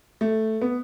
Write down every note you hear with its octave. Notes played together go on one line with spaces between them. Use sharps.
A3
B3